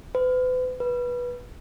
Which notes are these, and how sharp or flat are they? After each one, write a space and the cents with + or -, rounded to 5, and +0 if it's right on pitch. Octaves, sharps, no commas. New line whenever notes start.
B4 +40
B4 -15